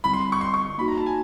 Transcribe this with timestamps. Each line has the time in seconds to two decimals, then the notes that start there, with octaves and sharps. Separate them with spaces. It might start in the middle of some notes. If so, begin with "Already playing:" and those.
0.04 D3 G3 C4 E4 B5
0.13 C6
0.32 C#6
0.41 C6
0.54 C#6
0.78 A#3 D#4 F#4 B5
0.88 A#5
0.97 A5
1.06 G#5